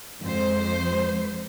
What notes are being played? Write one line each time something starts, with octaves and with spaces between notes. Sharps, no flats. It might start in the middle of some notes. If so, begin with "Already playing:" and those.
F2 G#3 C5